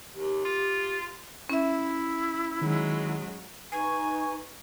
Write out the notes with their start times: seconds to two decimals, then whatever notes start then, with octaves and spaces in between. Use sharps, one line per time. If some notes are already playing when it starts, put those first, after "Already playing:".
0.15 D#2 G4
0.45 F4
1.50 C#4 E4 E5
2.61 D#3 F#3 G#3
3.72 D#4 B4 G#5 C#6